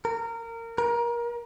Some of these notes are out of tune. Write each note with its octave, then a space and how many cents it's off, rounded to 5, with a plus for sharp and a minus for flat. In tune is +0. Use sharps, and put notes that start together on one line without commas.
A#4 -20
A#4 +25